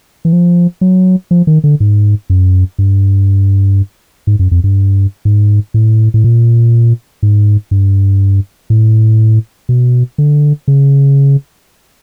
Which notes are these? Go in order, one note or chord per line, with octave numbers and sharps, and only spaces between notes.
E3
F3
F#3
F3
D#3
D3
G#2
F#2
G2
G#2
F#2
F2
G2
G#2
A2
A2
A#2
G#2
G2
A2
B2
D3
C#3